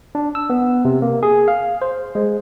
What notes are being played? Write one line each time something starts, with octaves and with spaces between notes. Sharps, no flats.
D4
E6
B3
C3
A#3
G#4
F5
C5
G#3